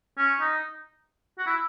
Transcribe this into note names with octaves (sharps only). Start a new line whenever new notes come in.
C#4
D#4
F#4
E4